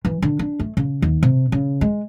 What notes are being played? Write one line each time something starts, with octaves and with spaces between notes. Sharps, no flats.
E3
D3
D4
A3
C#3
D#2
C3
C#3
G#3